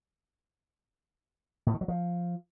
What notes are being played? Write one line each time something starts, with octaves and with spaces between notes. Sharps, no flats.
A2
D#3
F#3
F3